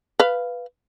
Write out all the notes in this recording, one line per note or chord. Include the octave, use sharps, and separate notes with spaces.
B4 F5